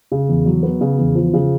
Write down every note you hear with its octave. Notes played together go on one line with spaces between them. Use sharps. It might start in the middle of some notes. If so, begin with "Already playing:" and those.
C#3
E2
F#3
B3
C#3
E2
F3
C#3